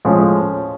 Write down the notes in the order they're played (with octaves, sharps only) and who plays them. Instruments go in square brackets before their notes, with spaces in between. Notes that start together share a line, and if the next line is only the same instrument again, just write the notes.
[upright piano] A2 F3 G#3 C#4